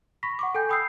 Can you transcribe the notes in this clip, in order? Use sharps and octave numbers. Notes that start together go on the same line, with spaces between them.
B5 C#6 A#6 B6
F#5 C#6 D6
A4 G5 G#5 G6
G5 B5 D#6 E6 G6 C7